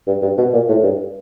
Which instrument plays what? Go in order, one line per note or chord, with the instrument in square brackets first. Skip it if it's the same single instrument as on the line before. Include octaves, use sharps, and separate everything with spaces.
[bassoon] G2
G2
B2
A#2
A2
G2